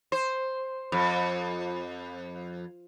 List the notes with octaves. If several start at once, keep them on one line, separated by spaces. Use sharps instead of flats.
C5
F2